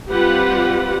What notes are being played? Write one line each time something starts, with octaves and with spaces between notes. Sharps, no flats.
G3 C4 F4 G4 B4 F#5